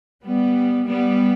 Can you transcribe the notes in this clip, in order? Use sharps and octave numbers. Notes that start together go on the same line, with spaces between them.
G3 B3
G3 B3